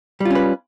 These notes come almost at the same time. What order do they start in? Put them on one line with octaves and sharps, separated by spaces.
G3 F4 C#4 B4